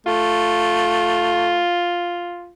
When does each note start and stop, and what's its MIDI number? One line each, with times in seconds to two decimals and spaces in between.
0.07 1.63 57
0.07 2.53 65